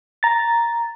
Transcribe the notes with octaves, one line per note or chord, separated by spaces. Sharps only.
A#5 A6